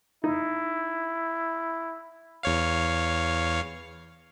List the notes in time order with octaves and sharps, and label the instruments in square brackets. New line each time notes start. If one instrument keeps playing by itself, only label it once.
[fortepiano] D#4 [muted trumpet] E4
[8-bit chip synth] E2 C#5 F5